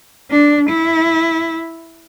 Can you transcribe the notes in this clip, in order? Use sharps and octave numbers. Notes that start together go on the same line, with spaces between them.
D4
E4